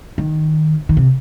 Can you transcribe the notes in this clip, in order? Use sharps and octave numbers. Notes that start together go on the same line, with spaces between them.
D#3
D#3
C3